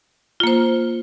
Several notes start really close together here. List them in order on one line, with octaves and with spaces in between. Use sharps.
F4 A#3 C5